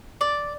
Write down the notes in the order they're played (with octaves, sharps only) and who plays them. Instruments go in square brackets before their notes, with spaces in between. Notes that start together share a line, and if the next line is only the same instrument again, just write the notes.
[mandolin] D5